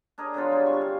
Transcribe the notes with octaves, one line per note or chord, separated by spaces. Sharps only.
D4 G#4 A#4 D#5
D3 F#3 B3 F4
G3 B3
C3 C#6
F5